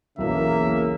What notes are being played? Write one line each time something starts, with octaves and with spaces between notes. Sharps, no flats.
B1 E2 C#3 E3 A#3 E5